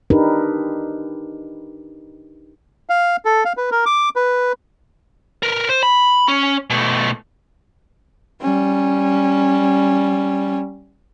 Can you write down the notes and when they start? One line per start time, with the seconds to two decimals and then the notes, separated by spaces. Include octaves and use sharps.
0.10 D4 D#4 G4 A#4 B4
2.90 F5
3.25 A4
3.45 F5
3.57 B4
3.71 A#4
3.86 D6
4.16 B4
5.43 A#4 B4
5.69 C5
5.83 B5
6.28 C#4
6.70 B2 A3
8.41 G3 C#4